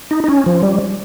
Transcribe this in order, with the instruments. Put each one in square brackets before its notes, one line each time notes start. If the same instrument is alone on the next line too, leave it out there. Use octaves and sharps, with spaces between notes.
[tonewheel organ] D#4
D#4
C#4
F3
G3